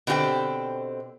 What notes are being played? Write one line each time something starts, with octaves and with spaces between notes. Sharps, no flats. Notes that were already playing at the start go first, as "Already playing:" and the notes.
B2 D3 C4 G4 C5 G5